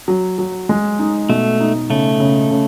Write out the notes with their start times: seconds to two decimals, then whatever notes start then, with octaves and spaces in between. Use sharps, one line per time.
0.08 F#3
0.39 F#3
0.69 G#3
0.99 D#4
1.29 B2 A3
1.60 D#4
1.90 C#3 A3
2.20 C#3
2.51 C#3